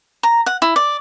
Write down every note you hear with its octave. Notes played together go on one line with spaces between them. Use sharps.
A#5
F#5
E4
D5